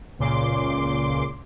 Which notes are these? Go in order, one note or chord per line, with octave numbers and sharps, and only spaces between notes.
C#2 A#2 C#3 C6 D6